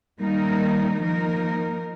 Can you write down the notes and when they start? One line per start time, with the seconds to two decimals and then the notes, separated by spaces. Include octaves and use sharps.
0.21 D#3 G3 A#3 D#4 A#4
1.01 F3 A#3 D#4 A#4